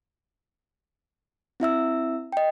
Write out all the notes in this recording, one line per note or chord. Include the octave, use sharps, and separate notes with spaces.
C4 E4 E5 E6
D#5 G5